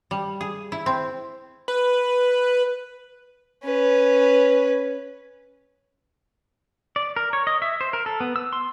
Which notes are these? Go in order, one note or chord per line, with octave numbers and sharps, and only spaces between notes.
G3
G#4
E4
C4
B4
C#4 B4
D5
A#4
C#5
D#5
E5
C5
A#4
A4
B3
E6
C6